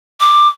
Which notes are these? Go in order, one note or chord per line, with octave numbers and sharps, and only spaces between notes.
D6